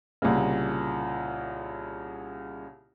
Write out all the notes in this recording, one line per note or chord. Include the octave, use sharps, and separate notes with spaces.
C2 A#2 C#3